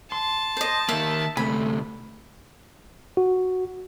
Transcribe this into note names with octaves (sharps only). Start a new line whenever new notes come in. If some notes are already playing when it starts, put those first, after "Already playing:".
A5 C6
C5 D#5
D#3 A#3 E5
D2 C3 A3 G#5 B5
F#4